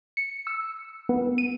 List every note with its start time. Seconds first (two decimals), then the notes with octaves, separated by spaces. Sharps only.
0.17 C#7
0.47 E6
1.09 B3
1.38 D#7